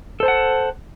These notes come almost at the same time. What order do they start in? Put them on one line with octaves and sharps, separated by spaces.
A4 C5 A5 F#5